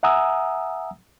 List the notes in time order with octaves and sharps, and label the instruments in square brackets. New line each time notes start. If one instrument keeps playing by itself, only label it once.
[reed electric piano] E5 F#5 G#5 A#5 D#6 E6